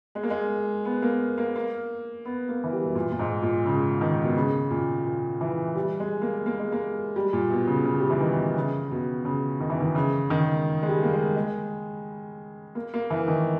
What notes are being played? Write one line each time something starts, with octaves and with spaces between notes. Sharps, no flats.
G#3
A#3
G#3
B3
A#3
A#3
A#3
B3
A#3
E3
G3
B2
A#2
A#2
G#2
A#2
C#3
D#3
B2
C#3
A#2
A#2
E3
G3
G#3
A#3
A#3
G#3
A#3
G3
A#2
B2
C#3
C#3
G3
E3
D#3
C#3
B2
C#3
D#3
E3
D#3
C#3
D#3
G#3
G3
A#3
G#3
G#3
A#3
A#3
E3
D#3